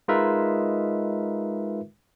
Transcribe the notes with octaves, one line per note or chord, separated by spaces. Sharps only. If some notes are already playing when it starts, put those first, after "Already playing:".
G#3 D#4 F4 A#4 B4 E5